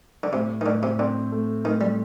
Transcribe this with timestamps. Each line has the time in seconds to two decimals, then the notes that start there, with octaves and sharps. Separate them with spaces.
0.23 D3
0.33 A2 C3
0.61 D#3
0.66 A2 D3
0.83 C3
0.99 D3 C4
1.32 A3
1.64 A2 D#3
1.81 G3